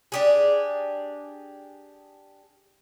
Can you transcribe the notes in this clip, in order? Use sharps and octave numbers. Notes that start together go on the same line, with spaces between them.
D4 G4 G#4